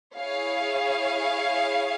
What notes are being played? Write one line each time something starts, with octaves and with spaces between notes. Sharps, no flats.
E4 G#4 C#5 F5